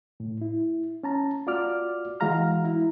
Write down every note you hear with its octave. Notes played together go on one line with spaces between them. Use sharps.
A2
E4
C#4 A5 A#5
F4 F#4 D5 D6 F6
E3 G#3 F#4 F5 A#5 F6
E4